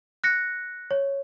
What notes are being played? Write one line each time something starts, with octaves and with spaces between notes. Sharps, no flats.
F#6 A#6 C#7
C#5